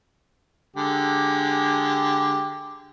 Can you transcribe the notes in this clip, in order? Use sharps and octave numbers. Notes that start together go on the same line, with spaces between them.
D3 G#3 G4